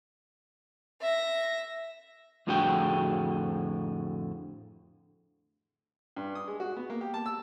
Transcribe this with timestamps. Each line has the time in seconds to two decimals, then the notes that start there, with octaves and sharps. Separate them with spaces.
1.01 E5 A#6
2.47 F2 A2 D3 F#4 G#4 G5
6.16 G2
6.35 D#6
6.48 G#3
6.60 F#4
6.77 B3
6.90 A#3
7.01 G4
7.14 A5
7.26 E6